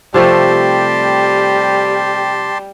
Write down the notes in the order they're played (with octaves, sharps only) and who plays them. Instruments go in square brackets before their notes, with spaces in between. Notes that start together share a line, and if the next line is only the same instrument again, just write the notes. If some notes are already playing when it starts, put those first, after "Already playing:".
[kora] C3 F3 A3 [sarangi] G3 [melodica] G4 A5 C6